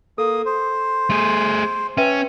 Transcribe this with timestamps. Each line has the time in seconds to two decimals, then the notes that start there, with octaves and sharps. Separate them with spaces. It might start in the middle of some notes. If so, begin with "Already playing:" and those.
0.18 A#3 A4 D#6
0.45 C5
1.10 A3 G#4
1.97 C#4 B4 E5 G5